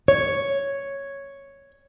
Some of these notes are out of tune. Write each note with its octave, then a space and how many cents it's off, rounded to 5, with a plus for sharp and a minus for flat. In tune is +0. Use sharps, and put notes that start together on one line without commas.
C#5 +0